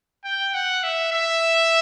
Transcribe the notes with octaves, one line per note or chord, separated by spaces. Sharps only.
G5
F#5
E5
E5